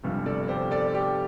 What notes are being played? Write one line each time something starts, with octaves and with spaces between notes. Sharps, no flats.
G1 F2 C3 G3
A4 D5
G4 C5
A4 D5
G4